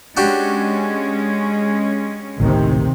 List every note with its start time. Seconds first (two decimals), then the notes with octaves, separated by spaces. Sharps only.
0.17 G#3 C#4 D4 F#4 G4
2.40 A1 D2 A2 C3 D#3